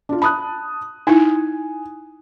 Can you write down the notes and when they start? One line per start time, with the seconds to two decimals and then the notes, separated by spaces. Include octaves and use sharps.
0.09 D4 F4
0.22 A5 B5 D#6 F#6
1.07 D#4 E4 G#5